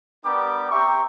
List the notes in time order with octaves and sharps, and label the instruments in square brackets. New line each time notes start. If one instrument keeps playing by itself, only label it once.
[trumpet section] G3 B3 D4 G4 A#4 D6
C4 G4 E5 G5 A#5 C#6